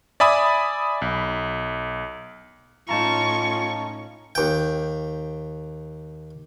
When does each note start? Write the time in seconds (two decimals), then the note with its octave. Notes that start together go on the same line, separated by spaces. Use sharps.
0.20 D5 E5 G#5 B5 D#6
1.02 B1
2.89 A2 C#4 D#4 F4 A5 A#5 C#6
4.35 D#2 G5